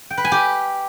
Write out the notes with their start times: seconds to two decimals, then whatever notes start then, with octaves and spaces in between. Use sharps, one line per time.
0.10 G5
0.17 B4
0.25 G#5
0.32 G4